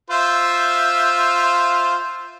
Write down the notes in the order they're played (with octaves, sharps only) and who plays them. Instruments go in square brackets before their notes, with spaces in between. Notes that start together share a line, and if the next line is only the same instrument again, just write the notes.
[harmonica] F4 C5 E5